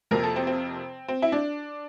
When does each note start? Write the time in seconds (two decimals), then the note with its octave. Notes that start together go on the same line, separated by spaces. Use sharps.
0.11 F2 C3 F3 A#3 A#4
0.23 A4
0.36 C4
0.47 C4
1.08 C4
1.22 E4
1.32 D4